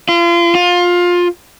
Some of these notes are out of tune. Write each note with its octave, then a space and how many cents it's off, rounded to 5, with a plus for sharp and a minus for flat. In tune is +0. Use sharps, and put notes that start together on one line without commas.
F4 -35
F4 +20